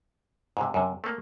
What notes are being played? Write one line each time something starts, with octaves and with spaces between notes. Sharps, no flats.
G#2 C3
F#2 C3
A3 A#3